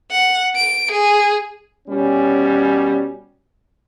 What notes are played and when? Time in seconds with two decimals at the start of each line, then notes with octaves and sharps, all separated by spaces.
0.12 F#5
0.56 D7
0.92 G#4
1.88 B2 G3 C#4